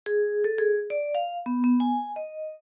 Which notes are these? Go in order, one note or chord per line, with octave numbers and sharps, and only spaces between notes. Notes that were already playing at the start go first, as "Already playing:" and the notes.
G#4
A4
G#4
D5
F5
B3
B3
G#5
D#5